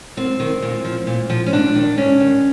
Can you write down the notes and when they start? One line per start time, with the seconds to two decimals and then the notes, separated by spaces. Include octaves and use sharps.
0.17 F#2 C4
0.40 D#3
0.62 A#2
0.85 F3
1.07 A#2
1.30 F3
1.46 C#4
1.52 G#2 D4
1.75 D#3
1.98 G#2 C#4
2.20 D#3